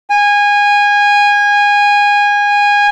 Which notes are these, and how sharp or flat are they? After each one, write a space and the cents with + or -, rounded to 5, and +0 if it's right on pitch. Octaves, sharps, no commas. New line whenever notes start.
G#5 -20